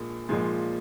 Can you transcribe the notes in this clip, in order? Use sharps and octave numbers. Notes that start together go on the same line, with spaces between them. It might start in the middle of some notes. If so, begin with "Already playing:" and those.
Already playing: A#1 A#2 F3 G#3
A#1 A#2 F3 G#3